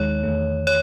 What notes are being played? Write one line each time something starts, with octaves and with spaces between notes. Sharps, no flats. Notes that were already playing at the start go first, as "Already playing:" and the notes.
Already playing: D#2 D#3 G#3 D#4 C#5
E2 D#3 A3
C#5